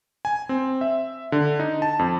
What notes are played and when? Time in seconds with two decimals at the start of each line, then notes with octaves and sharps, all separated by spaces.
0.25 G#5
0.49 C4
0.81 E5
1.32 D3
1.59 D#4
1.82 A5
1.99 F2